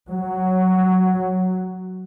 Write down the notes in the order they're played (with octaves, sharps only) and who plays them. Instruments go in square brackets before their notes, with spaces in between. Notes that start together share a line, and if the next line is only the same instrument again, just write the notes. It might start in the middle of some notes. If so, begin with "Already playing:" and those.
[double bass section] F#3